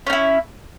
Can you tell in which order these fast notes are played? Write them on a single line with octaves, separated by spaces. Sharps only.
C#4 D#4 E4